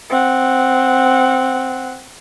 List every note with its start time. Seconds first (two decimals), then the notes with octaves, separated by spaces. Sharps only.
0.10 C4 F#5